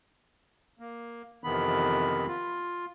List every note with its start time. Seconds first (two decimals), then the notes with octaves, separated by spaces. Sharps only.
0.79 A#3
1.44 F2 C3 D#3 E3 B3 B5
2.28 F4